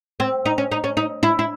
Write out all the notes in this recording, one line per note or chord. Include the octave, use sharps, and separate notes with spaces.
C4
D#4
C#4
D#4
C#4
D#4
E4
E4